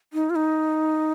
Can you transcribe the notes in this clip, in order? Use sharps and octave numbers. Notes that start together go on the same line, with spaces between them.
D#4
F4
D#4